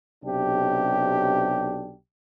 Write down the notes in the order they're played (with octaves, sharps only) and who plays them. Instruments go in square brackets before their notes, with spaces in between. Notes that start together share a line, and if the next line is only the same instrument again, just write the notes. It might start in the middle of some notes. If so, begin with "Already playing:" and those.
[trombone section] B1 C3 D4 G4